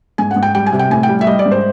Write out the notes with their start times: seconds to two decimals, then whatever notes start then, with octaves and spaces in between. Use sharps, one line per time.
0.18 G#2 G#5
0.31 F#5
0.36 G#2
0.43 G5
0.55 G3 G5
0.66 G#5
0.72 C3
0.79 G5
0.90 A2 G#5
1.03 G5
1.09 G3
1.21 E5
1.27 G3 D#5
1.39 D5
1.46 G#2
1.51 C5